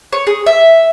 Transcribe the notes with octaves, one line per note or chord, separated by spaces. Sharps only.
C#5
G#4
E5